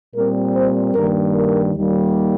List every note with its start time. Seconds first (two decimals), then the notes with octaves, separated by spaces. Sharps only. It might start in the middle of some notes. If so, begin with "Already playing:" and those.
0.15 A#2 G3 C4 A#4
0.55 C5
0.95 G2 D#3 G3 A#3 A#4
1.35 A#4
1.75 D#2 D#3 G3 A#3